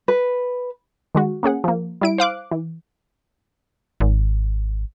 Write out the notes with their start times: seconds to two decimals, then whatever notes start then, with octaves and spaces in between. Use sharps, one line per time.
0.08 B4
1.15 D#3 G#3 F#4
1.43 A#3 C#4 G#4 F#5
1.64 F3 A#3
2.01 G3 E4 D7
2.18 C5 F5 D6 F#6
2.51 E3
4.00 G#1